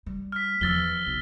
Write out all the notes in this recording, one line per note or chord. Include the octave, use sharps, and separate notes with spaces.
G3
F6 B6
E2 F3 E6 A6 G7
B1